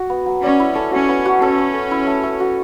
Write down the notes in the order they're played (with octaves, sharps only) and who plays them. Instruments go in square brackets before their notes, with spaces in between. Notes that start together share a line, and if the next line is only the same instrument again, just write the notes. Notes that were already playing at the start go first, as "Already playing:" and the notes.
Already playing: [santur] F#4
B3
F#3
[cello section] C#4 [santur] D5
[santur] E4
A4
[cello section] C#4 [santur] F#4
[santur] B3
F#4
[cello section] C#4 [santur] A4
[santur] C#5
A4
E4
A3
A3
F#4